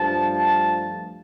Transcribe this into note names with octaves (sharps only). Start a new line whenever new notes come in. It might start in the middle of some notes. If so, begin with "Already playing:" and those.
Already playing: G2 F3 A3 A5
A5